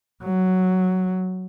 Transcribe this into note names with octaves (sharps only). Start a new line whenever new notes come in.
F#3